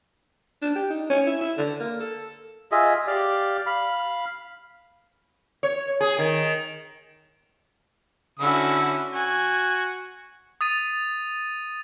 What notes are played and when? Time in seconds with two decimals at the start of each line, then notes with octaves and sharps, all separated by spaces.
0.62 D4
0.75 G4
0.90 D#4
1.10 C#4
1.26 E4
1.41 E4
1.57 D3
1.80 A#3
2.00 A4
2.72 F4 G#4 D#5 E5
3.07 G4 D5 F5
3.66 F5 B5
5.63 C#5
6.01 G#4
6.19 D#3
8.39 D3 C#4 E4 F#4 E6
9.13 F#4 G#5
10.61 D#6 A6 D#7